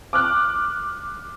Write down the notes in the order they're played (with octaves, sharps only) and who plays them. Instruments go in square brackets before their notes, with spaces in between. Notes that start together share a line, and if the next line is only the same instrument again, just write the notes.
[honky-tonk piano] D6 F6 F#6